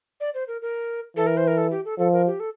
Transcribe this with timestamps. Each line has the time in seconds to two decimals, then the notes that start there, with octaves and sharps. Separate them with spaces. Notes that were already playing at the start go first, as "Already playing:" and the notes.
0.20 D5
0.34 C5
0.48 A#4
0.62 A#4
1.16 E3 A4
1.27 A#4
1.37 C5
1.47 A#4
1.57 A4
1.71 G4
1.85 A4
1.98 F3 A4
2.12 A#4
2.27 G4
2.40 A4